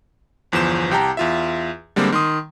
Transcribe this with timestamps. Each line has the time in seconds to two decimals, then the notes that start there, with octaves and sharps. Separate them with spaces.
0.52 G1 E2 F3 C5 E7
0.91 C2 G4 G5 A5 A#5
1.17 E2 F4 E5
1.96 D3 G3 G#3 A#3 C4
2.12 D#3 C6 D#6